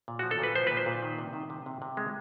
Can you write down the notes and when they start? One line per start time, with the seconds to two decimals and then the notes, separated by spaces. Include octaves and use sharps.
0.08 A#2
0.19 F3 F#4
0.31 A4
0.39 A#2 B4
0.55 F3 C5
0.67 A#2 B4
0.77 C5
0.86 A#2
1.03 D#3
1.18 C3
1.33 D#3
1.50 C3
1.66 C3
1.82 C3
1.97 G#3